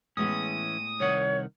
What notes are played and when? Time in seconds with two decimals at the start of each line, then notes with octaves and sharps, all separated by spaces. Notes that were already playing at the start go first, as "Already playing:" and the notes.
0.17 A2 E3 G#3 B3 C#4 D#6
1.00 C2 D#3 C#5 F#5